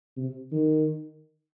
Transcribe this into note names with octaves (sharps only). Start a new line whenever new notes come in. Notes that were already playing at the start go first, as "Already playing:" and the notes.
C3
D#3